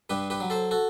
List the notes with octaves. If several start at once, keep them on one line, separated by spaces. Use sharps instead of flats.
G2 G4 B4
G4 B4
F#3
A4 C5
F#4 A4